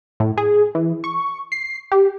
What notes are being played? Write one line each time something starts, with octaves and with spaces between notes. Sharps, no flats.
A2
G#4
E3
C#6
C7
G4